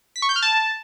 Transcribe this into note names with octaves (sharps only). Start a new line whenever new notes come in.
B6
C#6
G6
F6
A5